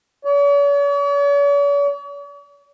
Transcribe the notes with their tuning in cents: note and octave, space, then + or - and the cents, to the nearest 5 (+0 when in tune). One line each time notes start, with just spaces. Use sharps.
C#5 +45